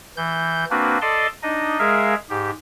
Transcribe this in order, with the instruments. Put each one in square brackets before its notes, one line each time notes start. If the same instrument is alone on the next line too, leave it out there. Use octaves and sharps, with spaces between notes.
[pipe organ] E3 G6
A#3 C4 D4 F#4 B4
A4 D5 D#5 A5 C6
D4 D#4 D#5
G#3 G#4 A#4 E5 F5
G#2 G4